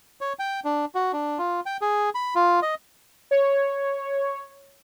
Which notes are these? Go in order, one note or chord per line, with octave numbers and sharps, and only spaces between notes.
C#5
G5
D4
F#4
D4
F4
G5
G#4
B5
F4
D#5
C#5